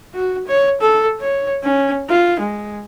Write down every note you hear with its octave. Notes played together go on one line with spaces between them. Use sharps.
F#4
C#5
A4
C#5
C#4
F4
G#3